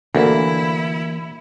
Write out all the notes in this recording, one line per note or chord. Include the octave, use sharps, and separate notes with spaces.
D2 E3 A#3 E4